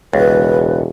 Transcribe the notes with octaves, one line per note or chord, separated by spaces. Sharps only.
E1 C#2 B4